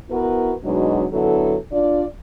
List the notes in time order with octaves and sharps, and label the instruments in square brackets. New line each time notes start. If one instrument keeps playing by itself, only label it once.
[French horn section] B3 E4 F#4 A#4 B4
B2 F#3 G#3 B3 D4 D#4
D3 F#3 B3 E4 A4
D4 F4 D5